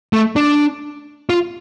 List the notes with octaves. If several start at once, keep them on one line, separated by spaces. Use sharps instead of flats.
A3
D4
F4